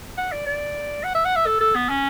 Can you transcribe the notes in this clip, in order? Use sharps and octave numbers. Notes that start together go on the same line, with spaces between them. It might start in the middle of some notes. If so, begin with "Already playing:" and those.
F#5
D5
D5
F#5
E5
F#5
E5
A4
A4
B3
C#4